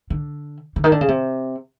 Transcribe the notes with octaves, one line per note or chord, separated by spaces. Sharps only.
D3
D3
D#3
D3
C#3
C3